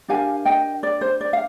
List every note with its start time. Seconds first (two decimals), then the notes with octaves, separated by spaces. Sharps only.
0.08 D4 G4 A#4 F5 G#5
0.45 D#5 G5
0.83 D5
1.01 C5
1.21 D5
1.33 F5